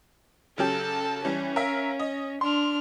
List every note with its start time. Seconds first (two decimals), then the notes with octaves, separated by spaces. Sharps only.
0.58 C#3 F#3 G4 A4 A5
1.25 E3 G3 C#4
1.56 A#4 E5 F5
2.00 D#5
2.41 D4 C6 F6